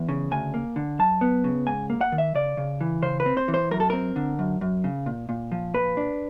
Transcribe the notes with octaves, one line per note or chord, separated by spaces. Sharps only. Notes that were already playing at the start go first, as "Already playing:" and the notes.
Already playing: E2
C#3
D2 G#5
A#3
D3
F#2 A5
B3
C#3
G#2 G#5
A#3
F#5
D#3
E5
C#3 D5
C#3
E3
C#3 C5
B4
C4
C5
E3
C5
F#2 A#4
A4
C4 A#4
D3
F#2
F#2
C#3
A#2
A#2
F3
A#2 B4
D4